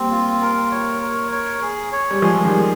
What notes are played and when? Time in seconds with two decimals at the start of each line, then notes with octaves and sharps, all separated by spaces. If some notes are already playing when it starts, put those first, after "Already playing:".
Already playing: G3 A#3 C4
0.11 F4
0.42 A#4
0.71 C#5
1.01 A#4
1.32 C#5
1.62 G#4
1.92 C#5
2.11 G3
2.22 F3 G#3 G#4
2.45 D#3 G3
2.52 G#4